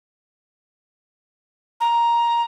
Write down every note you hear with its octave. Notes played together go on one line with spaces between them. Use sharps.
A#5